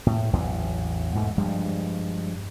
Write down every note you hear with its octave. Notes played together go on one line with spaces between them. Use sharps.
A2
A1 E2 F#3
G#2 B2 A3
G2 F3 G3 G#3